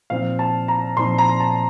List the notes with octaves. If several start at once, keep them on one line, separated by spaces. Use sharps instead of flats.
A#2 F3 C4 D#4 F5
A5
A#5
A#2 F3 C4 D#4 C6
A#5
A5